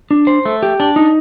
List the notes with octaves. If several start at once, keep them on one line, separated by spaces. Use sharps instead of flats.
D4
C5
A3
G4
D4
D#4